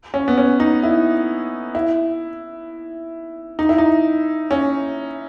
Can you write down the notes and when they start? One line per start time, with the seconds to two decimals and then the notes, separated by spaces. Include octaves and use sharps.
0.14 C#4
0.28 B3
0.38 C#4
0.60 D#4
0.83 E4
1.75 E4
3.59 D#4
3.69 E4
3.78 D#4
4.51 C#4